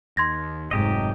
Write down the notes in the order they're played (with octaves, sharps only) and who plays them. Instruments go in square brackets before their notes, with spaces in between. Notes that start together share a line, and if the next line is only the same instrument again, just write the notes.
[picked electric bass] D#2 [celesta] C6 G#6 A#6
[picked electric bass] F1 C3 [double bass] G#2 [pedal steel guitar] F#3 G4 D#5